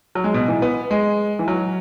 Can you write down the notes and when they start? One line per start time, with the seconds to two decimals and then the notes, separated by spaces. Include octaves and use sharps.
0.15 F#3
0.24 G#3
0.34 B2
0.48 E3
0.62 B3
0.91 G#3
1.39 E3
1.48 F#3